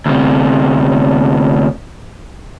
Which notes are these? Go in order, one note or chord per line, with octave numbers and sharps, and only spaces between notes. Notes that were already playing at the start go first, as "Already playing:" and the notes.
D2 C3